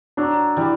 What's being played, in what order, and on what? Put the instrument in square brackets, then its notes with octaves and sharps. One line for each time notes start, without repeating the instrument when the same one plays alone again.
[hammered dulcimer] F#3 [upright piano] D4
[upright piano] E3 [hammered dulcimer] G3